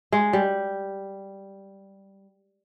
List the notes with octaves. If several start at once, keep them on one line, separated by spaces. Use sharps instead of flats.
G#3
G3